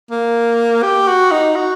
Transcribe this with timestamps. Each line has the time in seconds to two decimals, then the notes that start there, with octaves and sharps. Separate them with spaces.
0.11 A#3
0.83 G4
1.07 F#4
1.31 D#4
1.56 F#4